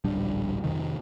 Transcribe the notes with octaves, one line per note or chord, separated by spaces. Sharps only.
D1 A#1 G3 D4
F2 C3 D#3